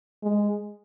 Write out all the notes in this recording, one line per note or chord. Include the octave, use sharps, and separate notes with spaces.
G#3